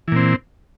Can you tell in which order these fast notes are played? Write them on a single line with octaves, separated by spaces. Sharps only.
E3 A#2 C4